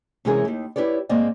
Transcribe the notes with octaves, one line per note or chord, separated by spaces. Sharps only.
C3 E3 G#3 C#4 G#4 A#4
D#2 D#3
E4 G4 B4 C#5 D5
G#2 A#3 C4 D5 D#5